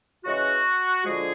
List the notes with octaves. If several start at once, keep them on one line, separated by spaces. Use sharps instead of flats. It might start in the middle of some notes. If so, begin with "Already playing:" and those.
C#3 E3 G#3 F#4
D3 F3 G#3 G#4